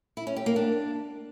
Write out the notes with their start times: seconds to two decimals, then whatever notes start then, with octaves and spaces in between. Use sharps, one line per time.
0.17 E4
0.27 C#4
0.36 G4
0.46 A#3
0.56 D4